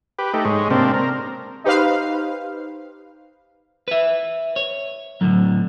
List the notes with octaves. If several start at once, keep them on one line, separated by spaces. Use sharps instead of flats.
G4 B4
A3 D#4 G4
G#2 G#3 C#5
C3 A#3 C4 D4
A#4
D#4 G4 B4 C5 F5
B4 E5
C#5
A2 D3 F#3